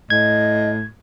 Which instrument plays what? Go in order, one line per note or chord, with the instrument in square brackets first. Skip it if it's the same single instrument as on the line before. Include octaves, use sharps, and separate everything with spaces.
[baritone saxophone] A2 [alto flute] D#5 [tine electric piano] G#6